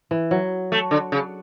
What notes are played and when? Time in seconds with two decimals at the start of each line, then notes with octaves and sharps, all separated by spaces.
0.11 E3
0.31 F#3
0.72 A3
0.91 D3
1.12 C#3